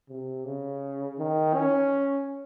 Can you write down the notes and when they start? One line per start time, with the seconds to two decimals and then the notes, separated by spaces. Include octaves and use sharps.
0.09 C3
0.45 C#3
1.18 D#3
1.54 C#4